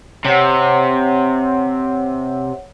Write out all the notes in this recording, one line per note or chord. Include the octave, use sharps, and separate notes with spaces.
C3 C#5 F#5